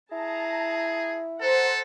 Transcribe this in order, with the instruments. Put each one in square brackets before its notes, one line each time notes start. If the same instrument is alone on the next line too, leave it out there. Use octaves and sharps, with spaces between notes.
[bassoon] E4 [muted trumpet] G#4 [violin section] A5 A#5
[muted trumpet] A4 [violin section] C5 F#5 A#5